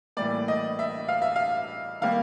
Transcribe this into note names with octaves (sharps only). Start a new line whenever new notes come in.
A2 E3 G3 A#3 D5
D#5
E5
F5
E5
F5
D#3 G3 A#3 F5